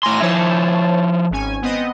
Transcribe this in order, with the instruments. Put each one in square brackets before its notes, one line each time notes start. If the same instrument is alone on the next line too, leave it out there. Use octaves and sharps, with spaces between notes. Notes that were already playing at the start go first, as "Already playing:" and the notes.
[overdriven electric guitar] A2 C6 [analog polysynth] G#5 A#6
[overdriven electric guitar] F3 E4 [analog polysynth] C5 C#5 A5
[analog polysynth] G#1 C#4 G#5
B3 C4 D#5